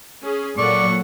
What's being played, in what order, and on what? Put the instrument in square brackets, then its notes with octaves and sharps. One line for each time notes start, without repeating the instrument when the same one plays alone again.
[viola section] C#4 G#4
[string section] A#2 F#3 [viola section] A4 F#5 [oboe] D5 [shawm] C#6